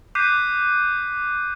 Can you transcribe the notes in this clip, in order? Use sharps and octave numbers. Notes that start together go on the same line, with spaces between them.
D6 F#6 G6 B6 C7 D#7